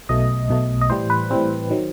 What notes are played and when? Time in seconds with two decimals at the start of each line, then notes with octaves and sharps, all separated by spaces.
0.09 B1 B2 A3 D#5
0.49 B1 B2 A3
0.81 D#5
0.90 A2 E3 G3 C5
1.10 B4
1.30 A2 E3 G3 C4
1.70 D#3 F#3